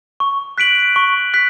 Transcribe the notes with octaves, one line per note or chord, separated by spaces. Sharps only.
C#6
F#6 B6 D7 F#7
C#6
F#6 B6